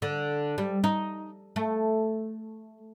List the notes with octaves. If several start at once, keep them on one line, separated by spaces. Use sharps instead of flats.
D3
G3
D#4
A3